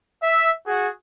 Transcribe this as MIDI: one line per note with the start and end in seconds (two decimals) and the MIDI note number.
0.22 0.51 76
0.67 0.88 66
0.67 0.88 68